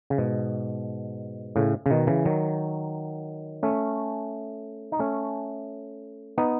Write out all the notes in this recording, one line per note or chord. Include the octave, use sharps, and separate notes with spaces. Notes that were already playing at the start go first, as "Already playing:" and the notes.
C#3
G#2 B2
A2 C#3
C#3
B2 D#3
C#3 E3
D#3 F#3
A3 C#4
D#4
A3 C#4
B3 D#4